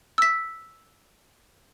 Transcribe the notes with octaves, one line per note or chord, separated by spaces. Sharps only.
E6 B6